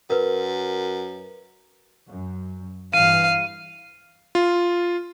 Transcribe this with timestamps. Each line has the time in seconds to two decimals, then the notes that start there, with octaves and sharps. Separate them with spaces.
0.10 F#2 A#4 B4
2.10 F#2
2.94 G2 E3 F5 D#7
4.35 F4